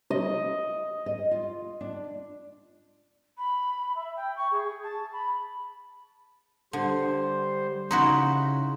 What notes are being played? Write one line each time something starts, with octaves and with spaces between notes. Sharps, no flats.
D#5
D#5
F4
D4
B5
E5
G5
C#6
G#4
A5
B5
D3 G3 C5
C#3 D#4 E4 F#4 C6